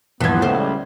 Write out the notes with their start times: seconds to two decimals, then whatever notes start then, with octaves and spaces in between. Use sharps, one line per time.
0.20 D#1 G2 E3 F3 B3 G#6
0.42 C#2 A3 C5
0.58 G3